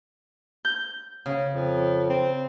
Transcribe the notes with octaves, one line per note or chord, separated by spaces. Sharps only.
G6
C#3
F2
C4